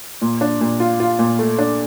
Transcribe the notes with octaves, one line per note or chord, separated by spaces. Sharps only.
A#2
D4
A#2
F4
F4
A#2
A3
D4